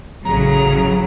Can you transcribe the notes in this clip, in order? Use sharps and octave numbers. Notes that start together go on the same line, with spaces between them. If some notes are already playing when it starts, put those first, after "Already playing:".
A1 C#3 F#3 A#5